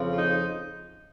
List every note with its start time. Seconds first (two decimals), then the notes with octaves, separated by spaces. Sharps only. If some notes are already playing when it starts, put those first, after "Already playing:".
Already playing: F2 C#3 F3
0.09 F4
0.17 D#4